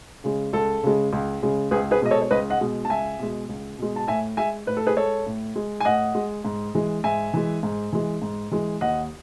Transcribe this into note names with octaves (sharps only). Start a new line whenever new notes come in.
C#3 G#3
C#2 A4
C#3 G#3
C#2
C#3 G#3
C#2 G#4 B4
G#4 B4
B2 G#3 D#5
A4 C#5
C#5
C#2 B4 D#5
D#5 F#5
B2 G#3
A5
C#2 E5 G#5
B2 G#3
C#2
B2 G#3
A5
A2 E5 G#5
G#3 E5 G#5
A2 B4
A4
G#4 B4
G#3 A4 C#5
A2
G#3
G#5
A2 D#5 F#5
G#3
G#2
E3 G#3
G#2 E5 G#5
E3 G#3
G#2
E3 G#3
G#2
E3 G#3
D#2 D#5 F#5